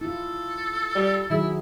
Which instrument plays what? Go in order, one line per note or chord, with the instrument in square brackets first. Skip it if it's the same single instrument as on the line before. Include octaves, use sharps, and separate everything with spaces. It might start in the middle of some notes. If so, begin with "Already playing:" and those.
[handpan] E4 F4 [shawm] A4
[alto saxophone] G3
[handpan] D#3 F#3 G#4 [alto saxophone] E4